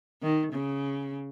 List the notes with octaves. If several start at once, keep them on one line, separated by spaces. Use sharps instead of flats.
D#3
C#3